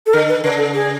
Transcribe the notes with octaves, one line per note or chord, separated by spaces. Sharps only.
A4
D3 A#4
B4
C#3 B4
A4
G#4